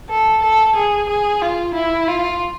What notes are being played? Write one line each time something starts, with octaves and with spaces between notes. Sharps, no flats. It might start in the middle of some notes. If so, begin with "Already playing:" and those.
A4
A4
G#4
G#4
F4
E4
F4